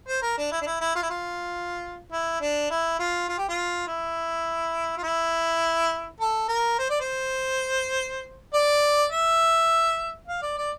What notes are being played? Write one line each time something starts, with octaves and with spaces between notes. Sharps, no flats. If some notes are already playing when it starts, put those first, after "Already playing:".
C5
A#4
D4
E4
D4
E4
E4
F4
E4
F4
E4
D4
E4
F4
F4
G4
F4
E4
F4
E4
A4
A#4
C5
D5
C5
D5
E5
F5
D5
D5